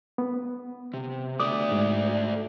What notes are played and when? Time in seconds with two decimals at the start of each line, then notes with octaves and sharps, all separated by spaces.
0.18 B3
0.94 C3
1.40 A3 D5 D6 D#6
1.72 G#2